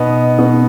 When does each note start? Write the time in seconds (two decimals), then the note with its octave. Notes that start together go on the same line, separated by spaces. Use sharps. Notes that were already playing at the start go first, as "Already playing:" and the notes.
Already playing: B2 B3 D#4
0.39 B2 B3 D#4